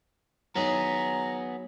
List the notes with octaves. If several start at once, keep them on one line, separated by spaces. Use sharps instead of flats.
F#3 B3 D#4 G#4 A#5